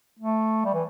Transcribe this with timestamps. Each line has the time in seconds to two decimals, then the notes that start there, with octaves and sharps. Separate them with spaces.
0.19 A3
0.65 G3
0.74 E3